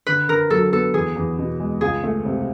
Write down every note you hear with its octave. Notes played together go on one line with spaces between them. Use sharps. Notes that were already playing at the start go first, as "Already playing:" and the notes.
D3 B4
D3 A#4
F#3 A4
B3 A4
E2 G#4
E2
B2
G#3
C#2 G#4
A3
C3